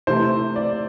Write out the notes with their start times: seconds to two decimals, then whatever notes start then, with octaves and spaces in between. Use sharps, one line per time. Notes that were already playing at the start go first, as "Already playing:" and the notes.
0.07 C3 E3 A3 C5
0.56 D5